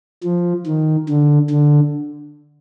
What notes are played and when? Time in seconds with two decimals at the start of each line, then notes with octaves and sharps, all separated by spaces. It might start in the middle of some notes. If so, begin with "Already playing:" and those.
0.24 F3
0.67 D#3
1.09 D3
1.50 D3